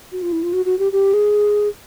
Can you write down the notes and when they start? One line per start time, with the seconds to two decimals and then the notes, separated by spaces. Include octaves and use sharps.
0.12 F#4
0.22 F4
0.32 E4
0.43 F4
0.53 F#4
0.66 F#4
0.79 G4
0.92 G4
1.14 G#4